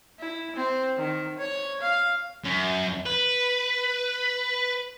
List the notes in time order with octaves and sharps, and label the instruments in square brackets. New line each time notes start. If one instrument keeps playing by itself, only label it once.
[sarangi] E4
C4
D#3
C#5
F5
[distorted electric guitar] F#2
B4